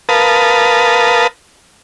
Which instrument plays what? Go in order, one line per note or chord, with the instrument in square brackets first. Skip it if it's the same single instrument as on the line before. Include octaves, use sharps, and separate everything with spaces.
[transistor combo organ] A#4 B4 F5 A5 D#6